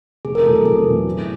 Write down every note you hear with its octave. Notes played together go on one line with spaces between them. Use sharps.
F1 G#4
A#4
E2 B2 F#3 A3 A4
A4
F1 G#4
E2 B2 F#3 A3
A2